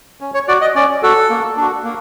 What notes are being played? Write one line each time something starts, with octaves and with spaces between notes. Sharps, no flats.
C#4
C#5
F#4 D5
D#5
C#4 D5
F#4 A4
A#3
D4 F#4
A#3